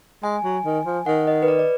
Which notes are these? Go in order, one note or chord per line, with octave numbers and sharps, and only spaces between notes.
G#3 G#5
F#3
D#3
F3
D#3 F#5
D#5
B4
D5
D5